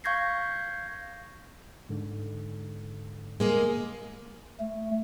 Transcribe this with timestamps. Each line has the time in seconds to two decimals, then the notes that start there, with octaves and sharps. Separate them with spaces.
0.04 F5 C#6 G6 G#6 A#6 C7
1.89 G#2 D3
3.40 G#3 A#3 G#4
4.60 A3